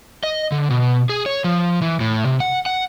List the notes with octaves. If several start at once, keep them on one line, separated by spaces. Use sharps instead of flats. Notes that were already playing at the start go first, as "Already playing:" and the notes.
D#5
D3
B2
G#4
C#5
F3
E3
A2
C3
F#5
F#5